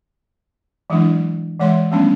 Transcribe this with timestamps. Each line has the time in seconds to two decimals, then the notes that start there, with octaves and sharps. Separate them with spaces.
0.90 E3 F#3 G#3 D4 E4
1.60 E3 G#3 C#5 E5 C6
1.91 F3 G3 A3 B3 C#4 D4